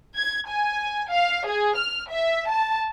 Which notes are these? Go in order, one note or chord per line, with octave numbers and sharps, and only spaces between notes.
G#6
G#5
F5
G#4
F6
E5
A5